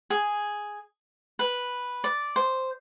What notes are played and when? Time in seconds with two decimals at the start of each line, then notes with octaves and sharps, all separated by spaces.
0.10 G#4
1.39 B4
2.04 D5
2.36 C5